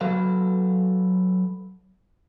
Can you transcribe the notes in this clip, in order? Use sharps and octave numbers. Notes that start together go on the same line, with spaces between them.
F#3 A4 B4 F5